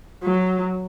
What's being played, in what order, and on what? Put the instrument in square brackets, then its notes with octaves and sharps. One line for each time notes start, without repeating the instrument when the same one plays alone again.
[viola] F#3